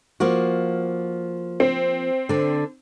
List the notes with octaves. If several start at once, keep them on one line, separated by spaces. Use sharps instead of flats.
F3 A#3 F#4
C4
D3 D4